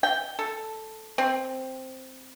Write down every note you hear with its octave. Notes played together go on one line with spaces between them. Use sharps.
G5
A4
C4